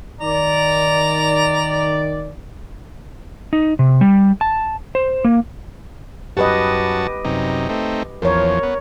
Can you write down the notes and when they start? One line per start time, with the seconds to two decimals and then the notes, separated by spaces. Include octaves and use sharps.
0.21 D#3 D5 A#5
3.53 D#4
3.79 C3
4.01 G3
4.41 A5
4.95 C5
5.25 A#3
6.37 F#2 F#4 G4 B4 D#5 A5
7.25 F#2 C3 D#4
7.69 A3 C4 D#4
8.22 E2 F3 A#4 C#5
8.63 B3